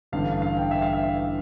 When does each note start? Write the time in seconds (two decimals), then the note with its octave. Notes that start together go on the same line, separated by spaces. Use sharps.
0.12 A1 G2 D3 F5
0.42 F5
0.56 G5
0.71 E5
0.82 F5
0.93 E5